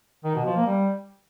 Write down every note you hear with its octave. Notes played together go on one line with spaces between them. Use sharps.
D#3
B2
F3
A#3
G3